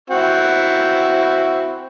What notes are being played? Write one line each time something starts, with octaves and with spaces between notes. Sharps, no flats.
C4 E4 F#4